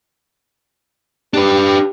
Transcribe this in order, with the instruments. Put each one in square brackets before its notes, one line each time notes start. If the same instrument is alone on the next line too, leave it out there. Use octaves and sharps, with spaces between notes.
[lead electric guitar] D4 B4 [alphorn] G4